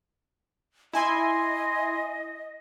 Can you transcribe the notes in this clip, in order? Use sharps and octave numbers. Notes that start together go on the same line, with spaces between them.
E4 D#5 G#5 C6